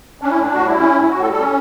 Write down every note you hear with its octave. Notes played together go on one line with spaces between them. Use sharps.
C#4 D4
E4
A2 D4
A2 F#4
G3 E4
C#4
A2
E4
A2 F#4
A4
G3
A4
C#4